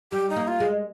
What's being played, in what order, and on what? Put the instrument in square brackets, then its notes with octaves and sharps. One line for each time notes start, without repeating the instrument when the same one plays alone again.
[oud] G3 [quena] G4
[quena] D#4
[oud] A#3
[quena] F4
[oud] G#3